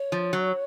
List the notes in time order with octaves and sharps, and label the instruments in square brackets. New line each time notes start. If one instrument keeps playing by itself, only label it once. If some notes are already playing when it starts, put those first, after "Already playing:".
Already playing: [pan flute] C#5
[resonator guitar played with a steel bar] F3
F#3